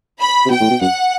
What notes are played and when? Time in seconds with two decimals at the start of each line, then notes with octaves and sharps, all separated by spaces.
0.20 B5
0.46 C3
0.50 B2 G5
0.61 A2
0.71 B2
0.81 F#2 F#5